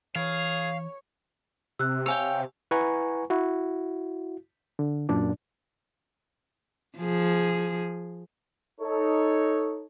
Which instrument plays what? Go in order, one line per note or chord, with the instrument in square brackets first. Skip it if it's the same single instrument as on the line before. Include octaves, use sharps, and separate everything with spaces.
[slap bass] E3 [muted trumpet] G#4 [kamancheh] C#5 [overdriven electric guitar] F5
[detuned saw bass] C3 [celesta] E6 F#6
[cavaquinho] C#5 F5 G5 [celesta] G#5 E6
[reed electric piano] E4 B4 F#5 G#5 A#5 C#6
E4 F#4
D3
F#2 A#2 D4 D5
[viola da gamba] F3 G#4
[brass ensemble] D#4 A4 C#5